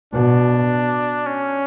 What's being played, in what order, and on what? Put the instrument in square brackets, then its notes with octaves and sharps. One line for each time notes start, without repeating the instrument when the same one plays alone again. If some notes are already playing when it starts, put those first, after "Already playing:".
[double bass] B2 [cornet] D4
[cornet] C#4